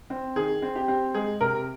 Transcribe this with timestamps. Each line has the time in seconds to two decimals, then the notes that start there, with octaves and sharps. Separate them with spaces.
0.10 C4
0.36 D#3 G#4
0.62 C4
0.75 G4
0.88 C4
1.14 G#3 G#4
1.41 C3 A#4